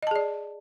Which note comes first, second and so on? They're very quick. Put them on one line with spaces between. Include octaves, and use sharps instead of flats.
D#5 A5 G#4 D5